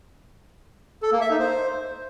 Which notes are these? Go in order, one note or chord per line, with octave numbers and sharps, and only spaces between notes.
A4
A#3
E5
D#4
C5